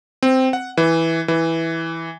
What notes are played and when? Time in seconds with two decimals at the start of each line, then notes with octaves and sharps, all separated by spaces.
0.23 C4
0.53 F#5
0.77 E3
1.28 E3